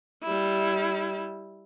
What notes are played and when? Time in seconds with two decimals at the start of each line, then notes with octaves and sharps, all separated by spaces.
0.23 G3 E4